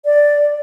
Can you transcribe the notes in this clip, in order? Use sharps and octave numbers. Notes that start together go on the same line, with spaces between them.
D5